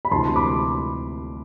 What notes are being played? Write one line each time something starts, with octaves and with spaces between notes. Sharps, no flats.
B5
D2 C3 E3 A5 C6
B5 D6